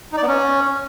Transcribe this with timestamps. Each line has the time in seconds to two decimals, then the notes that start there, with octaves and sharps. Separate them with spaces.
0.12 D#4
0.17 D5
0.23 B3
0.28 C#4